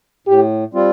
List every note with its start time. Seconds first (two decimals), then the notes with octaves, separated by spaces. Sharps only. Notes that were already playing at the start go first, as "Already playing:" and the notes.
0.27 A2 G4
0.73 G3 C4 F4